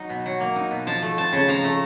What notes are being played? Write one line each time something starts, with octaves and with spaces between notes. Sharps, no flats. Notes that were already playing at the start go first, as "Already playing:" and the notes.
Already playing: F#3 D#4 A#5
B2
F#3
A#3
D#4
B2
F3 A5
A3
C4 A5
C#3 A5
F3 A#5
A3